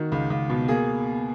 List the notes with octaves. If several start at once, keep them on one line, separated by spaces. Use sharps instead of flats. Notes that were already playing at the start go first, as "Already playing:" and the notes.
Already playing: D#3 F#4
C#2
C#2
B2
A#3 G#4